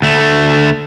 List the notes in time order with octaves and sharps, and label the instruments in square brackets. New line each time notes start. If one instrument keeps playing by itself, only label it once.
[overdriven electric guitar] D2 A3